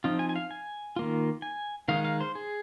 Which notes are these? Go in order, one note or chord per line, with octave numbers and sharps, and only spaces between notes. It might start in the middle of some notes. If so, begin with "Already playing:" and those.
F3 C4 D#4 F4
G#5
G#5
F5
G#5
D#3 A#3 F4
G#5
D#3 G#3 D#4 F5
F5
C5
G#4